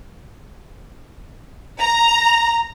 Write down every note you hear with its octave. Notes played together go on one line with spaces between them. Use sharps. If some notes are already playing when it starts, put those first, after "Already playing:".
A#5